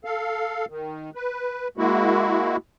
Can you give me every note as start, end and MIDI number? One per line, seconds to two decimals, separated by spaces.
0.05 0.65 69
0.05 0.65 77
0.70 1.10 51
1.15 1.68 71
1.78 2.57 56
1.78 2.57 58
1.78 2.57 64
1.78 2.57 66